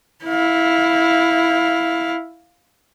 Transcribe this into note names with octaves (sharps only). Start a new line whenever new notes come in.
E4 F5